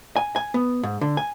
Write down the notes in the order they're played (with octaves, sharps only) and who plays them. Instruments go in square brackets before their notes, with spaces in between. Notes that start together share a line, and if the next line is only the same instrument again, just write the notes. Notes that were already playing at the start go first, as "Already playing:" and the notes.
[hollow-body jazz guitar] G#5
G#5
B3
G#2
D3
G#5